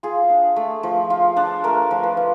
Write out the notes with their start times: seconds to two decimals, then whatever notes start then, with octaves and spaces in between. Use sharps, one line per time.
0.03 F4 G#4
0.30 D4
0.56 A3
0.83 F3
1.10 F4
1.37 D4
1.64 A3 A#4
1.91 F3
2.03 B4
2.17 F4